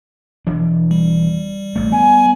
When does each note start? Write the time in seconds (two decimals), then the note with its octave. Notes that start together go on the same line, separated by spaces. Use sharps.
0.47 E1 E3 D4
0.91 G3
1.76 A1 A3
1.92 B3 G#5